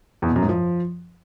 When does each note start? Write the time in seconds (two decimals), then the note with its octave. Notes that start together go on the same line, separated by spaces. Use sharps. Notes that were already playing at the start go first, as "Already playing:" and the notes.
0.22 E2
0.29 B2
0.36 F#2
0.42 G#2
0.49 F3